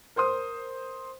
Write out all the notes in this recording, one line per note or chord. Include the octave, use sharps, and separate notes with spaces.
A#4 C5 C6 D#6